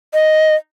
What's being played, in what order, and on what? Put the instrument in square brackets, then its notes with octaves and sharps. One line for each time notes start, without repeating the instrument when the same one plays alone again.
[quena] D#5